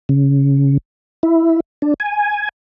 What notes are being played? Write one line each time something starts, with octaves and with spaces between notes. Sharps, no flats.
C#3
E4
D4
G#5